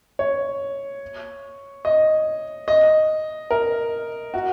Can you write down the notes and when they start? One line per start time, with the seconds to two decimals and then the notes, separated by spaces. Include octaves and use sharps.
0.19 C#5
1.85 D#5
2.68 D#5
3.51 A#4
4.34 F#4